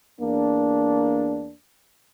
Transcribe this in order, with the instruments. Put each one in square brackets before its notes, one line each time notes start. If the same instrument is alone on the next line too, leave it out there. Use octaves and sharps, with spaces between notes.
[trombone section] E2 A#3 D4